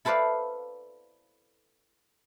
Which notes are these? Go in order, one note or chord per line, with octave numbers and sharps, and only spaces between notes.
E4 A4 B4 C5 D5 F5